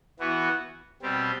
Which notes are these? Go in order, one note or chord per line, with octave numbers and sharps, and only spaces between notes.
E3 B3 F#4
B2 G3 C4 G4